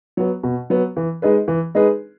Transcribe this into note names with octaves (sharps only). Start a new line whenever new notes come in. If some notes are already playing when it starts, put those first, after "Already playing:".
F#3 B3
B2
F#3 B3
E3
G#3 D#4 G#4 B4
E3
G#3 D#4 G#4 B4